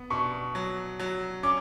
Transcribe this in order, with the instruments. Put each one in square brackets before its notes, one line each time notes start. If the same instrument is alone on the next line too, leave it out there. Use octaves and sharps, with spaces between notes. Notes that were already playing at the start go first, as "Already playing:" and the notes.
Already playing: [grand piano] B3
[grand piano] B2 [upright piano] C#6
[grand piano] F#3
F#3
[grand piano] C#4 [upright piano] D6